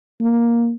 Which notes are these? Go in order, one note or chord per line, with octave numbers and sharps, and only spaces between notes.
A#3